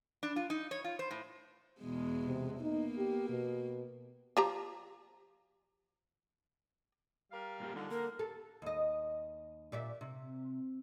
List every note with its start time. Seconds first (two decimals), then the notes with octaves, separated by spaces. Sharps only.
0.23 D4
0.36 F4
0.50 D#4
0.71 C#5
0.84 F4
0.99 C5
1.11 A2
1.81 E2 B2 G#3
2.26 C3
2.61 A#3 B3 D#4
2.98 G4
3.29 B2
4.37 F3 G4 A#5
7.31 G3 A#4 F5
7.60 G2 A#2 G4
7.75 D3 G3 D#4 F4
7.91 A#3 A#4
8.19 A4
8.62 D#2 D#5
9.72 A#2 D5 E5
10.01 C3